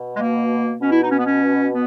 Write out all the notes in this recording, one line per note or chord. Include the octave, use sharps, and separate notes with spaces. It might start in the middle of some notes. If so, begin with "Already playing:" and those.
Already playing: B2
G#3
A#3
B2 C#4
E4
D#4
C#4
B3
C#4
B3